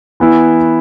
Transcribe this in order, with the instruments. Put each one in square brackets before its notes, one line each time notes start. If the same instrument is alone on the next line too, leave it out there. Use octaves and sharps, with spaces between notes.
[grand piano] E3 B3 E4